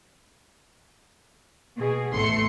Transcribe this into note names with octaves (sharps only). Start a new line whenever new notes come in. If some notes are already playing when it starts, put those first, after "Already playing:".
B2 G#4
A1 E2 E3 A3 C6 C#7